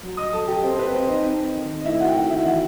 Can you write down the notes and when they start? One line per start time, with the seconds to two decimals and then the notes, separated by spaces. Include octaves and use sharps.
0.03 F#3
0.17 D#5 D#6
0.33 F#3 A4 A5
0.48 G4 G5
0.63 C4 C5
0.79 B4
0.94 C4 C5
1.08 D#4 D#5
1.24 C4
1.55 D#3
1.81 D#5
1.85 A3 E4 E5
2.01 F#4 F#5
2.08 G5
2.15 D#3 F#4 F#5
2.30 E4 E5
2.45 E3 F#4 F#5